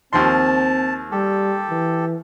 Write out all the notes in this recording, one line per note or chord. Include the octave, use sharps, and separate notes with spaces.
D#2 F3 C4 A5 C6
G3 G4 A4
E3